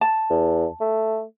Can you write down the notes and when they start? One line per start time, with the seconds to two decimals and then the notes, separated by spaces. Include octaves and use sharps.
0.01 A5
0.30 E2
0.81 A3